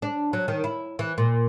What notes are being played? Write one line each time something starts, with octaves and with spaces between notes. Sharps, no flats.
D4
F#3
D#3
E4
E3
A#2